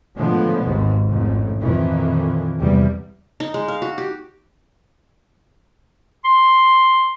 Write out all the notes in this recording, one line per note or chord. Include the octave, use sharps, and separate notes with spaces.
A2 D3 F3 G#3 B3
G#1 D#2 G#2
A1 F2 G#2
F2 A#2 D#3 E3
E2 C3 G3
D#4
G#3
F5
F#4
G4
C6